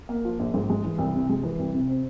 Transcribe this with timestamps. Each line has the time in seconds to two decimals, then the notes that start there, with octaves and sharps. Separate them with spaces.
0.09 A#3
0.25 F3
0.39 A#1
0.54 G#2
0.70 G#3
0.85 E3
0.98 C2
1.14 C3
1.29 G#3
1.43 E3
1.59 C2
1.74 C3
1.89 C4